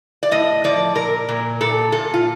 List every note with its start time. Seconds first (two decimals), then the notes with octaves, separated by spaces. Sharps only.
0.23 D5
0.31 A2 D#5
0.64 F3 D5
0.95 A#2 A#4
1.29 A#2
1.61 A#2 A4
1.92 A#2 A4
2.14 F4